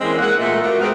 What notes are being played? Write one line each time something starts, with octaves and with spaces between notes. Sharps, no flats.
E3 G#3 A#3 C4 C#4
G#3 A#3 F#5
A#2 G#3 A3
A3 A#3 F#4
G#3 B3 C4 A#4